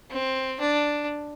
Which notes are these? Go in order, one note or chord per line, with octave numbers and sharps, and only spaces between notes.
C4
D4